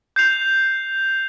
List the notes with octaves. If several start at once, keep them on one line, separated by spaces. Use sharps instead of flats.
G6 C7 F7